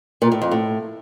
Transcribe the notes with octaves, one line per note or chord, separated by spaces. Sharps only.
A#2
A2
F2
A2